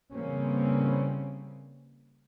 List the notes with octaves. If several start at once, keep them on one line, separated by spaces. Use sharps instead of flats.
C#3 E3 G3 A#3 C4 C#4